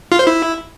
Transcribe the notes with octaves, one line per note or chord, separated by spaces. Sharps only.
F4
C5
E4